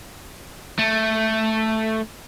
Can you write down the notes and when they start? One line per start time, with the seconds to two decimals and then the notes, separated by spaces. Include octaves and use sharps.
0.79 A3